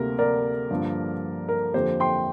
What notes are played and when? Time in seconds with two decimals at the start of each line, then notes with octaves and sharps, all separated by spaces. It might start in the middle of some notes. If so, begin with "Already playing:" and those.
Already playing: D2 C3 G3 A#3 A#4
0.19 A#4 D5
0.71 G2 D3 F3 A#3
1.49 A#4
1.74 F2 D3 A#3 G4 C5
2.00 G5 C6